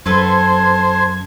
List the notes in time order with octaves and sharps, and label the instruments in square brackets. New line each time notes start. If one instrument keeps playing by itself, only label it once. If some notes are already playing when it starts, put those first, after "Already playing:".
[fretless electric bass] F#2 [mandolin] A4 B4 [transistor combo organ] C5 [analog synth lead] G#6